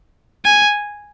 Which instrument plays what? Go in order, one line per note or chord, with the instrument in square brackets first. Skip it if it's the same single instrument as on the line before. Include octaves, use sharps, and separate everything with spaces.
[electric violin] G#5